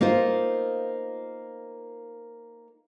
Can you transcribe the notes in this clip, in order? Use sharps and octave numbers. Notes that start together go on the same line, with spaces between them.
A#3 D#4 F4 C5